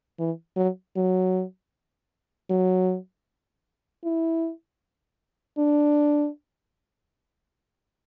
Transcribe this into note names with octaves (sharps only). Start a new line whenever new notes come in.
E3
F#3
F#3
F#3
E4
D4